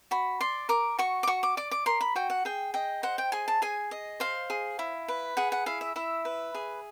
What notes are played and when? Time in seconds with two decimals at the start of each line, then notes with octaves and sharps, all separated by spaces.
0.11 F#4 B5
0.41 D5 C6
0.69 A#4 D6
0.99 F#4 C#6
1.23 D6
1.27 F#4 C#6
1.43 D6
1.57 D5 D6
1.71 D6
1.86 A#4 C6
2.01 B5
2.15 F#4 G5
2.30 F#5
2.45 G#4 G5
2.74 D#5 G5
3.03 C5 F#5
3.18 G5
3.32 G#4 G#5
3.48 A5
3.62 G#4 G#5
3.91 D#5
4.20 C5 F5
4.50 G#4
4.79 E4
5.08 B4
5.37 G#4 F#5
5.52 F#5
5.66 E4 F5
5.81 E5
5.96 E4 E5
6.25 B4
6.55 G#4